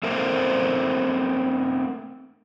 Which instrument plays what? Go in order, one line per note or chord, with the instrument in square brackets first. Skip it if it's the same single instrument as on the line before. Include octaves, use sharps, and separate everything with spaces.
[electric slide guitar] A3 A#3 C4 A#4 C5